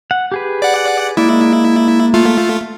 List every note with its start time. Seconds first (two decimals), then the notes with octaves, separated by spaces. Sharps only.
0.11 F#5
0.32 G4 G#4 B4
0.62 D5 F#5
1.17 G#3 A#3 E4 D5
2.14 A3 F4